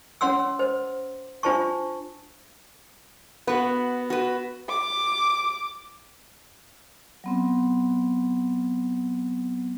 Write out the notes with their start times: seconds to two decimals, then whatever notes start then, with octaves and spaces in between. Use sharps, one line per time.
0.21 C#4 C#5 F#5 C6 E6
0.59 C5
1.43 D4 F4 C5 A5 C#6
3.47 B3 F#4 B4
4.10 F#4 B4
4.69 D6
7.24 F#3 B3 C4